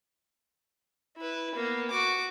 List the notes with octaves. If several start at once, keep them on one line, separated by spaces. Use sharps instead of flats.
E4 B4
A#3 B3
F#4 D6